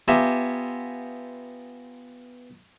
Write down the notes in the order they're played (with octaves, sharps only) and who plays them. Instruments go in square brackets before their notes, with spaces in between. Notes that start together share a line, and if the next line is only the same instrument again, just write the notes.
[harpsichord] B3 F4 G4 E5 G#5 A#5